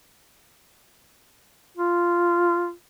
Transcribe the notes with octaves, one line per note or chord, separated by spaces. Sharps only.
F4